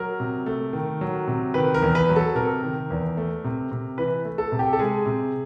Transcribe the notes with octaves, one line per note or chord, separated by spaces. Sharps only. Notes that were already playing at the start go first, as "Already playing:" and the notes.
Already playing: F#3 A#4
C3
A3
D#3
F#3
C3
D#3 B4
A#4
E2
B4
F#3
A4
C3 A#4
D#3
E2
A3
C3
C3
E3 B4
A3
A4
C3
G4
A4
G#3 G#4
C3